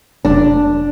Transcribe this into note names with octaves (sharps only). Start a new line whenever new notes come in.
F1 D4